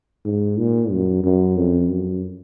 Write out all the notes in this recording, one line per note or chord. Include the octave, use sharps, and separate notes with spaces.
G#2
A#2
F#2
F#2
F2
F#2